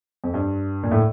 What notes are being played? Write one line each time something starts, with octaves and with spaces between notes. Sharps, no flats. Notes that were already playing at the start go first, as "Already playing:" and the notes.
F2
G2
A#2
A2